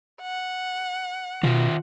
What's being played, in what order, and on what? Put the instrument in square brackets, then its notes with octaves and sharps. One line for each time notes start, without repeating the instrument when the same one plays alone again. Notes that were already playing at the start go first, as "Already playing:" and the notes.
[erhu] F#5
[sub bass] B2 [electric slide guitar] D#3 F4